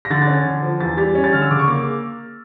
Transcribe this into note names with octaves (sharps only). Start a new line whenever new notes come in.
A#6
D3 A6
A6
C#4
A6
D3
F3
E2 A6
G3 A6
C#4
A6
D3 F6
E6
C#3 D6
C#6
A#3 D6